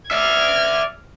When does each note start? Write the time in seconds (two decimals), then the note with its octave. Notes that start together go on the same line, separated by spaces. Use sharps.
0.11 D5 E5 F6 G#6